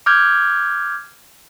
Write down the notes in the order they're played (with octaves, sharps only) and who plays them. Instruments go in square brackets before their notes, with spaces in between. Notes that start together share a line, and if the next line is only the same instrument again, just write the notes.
[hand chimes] D6 F6 G6 G#6